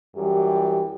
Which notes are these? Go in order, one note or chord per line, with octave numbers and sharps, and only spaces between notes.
F#2 E3 G3 G4